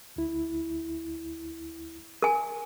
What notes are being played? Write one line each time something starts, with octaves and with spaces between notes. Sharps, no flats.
D2 E4
A#4 G#5